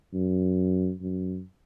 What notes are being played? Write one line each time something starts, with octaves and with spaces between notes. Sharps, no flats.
F#2
F#2